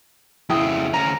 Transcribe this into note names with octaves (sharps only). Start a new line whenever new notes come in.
F2 C#3 E4 G5 D#6
D2 C#4 A#5